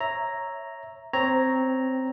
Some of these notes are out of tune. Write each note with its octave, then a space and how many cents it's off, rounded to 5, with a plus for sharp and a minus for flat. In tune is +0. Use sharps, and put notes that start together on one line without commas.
C#5 -5 E5 +0 A#5 +0
C4 -5 C#5 +0 A#5 +0